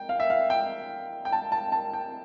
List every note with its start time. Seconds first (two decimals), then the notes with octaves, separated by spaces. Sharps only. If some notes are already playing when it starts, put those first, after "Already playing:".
Already playing: G5
0.09 F5
0.20 E5
0.30 F5
0.50 G5
1.25 G5
1.32 A5
1.52 A5
1.72 A5
1.93 G5